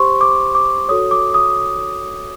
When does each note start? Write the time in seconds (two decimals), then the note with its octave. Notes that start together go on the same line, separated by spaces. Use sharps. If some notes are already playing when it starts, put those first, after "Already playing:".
Already playing: G4 C5 C6 C#6
0.21 D6
0.55 D6
0.89 F#4 A4 C#5 D#6
1.11 D6
1.34 D#6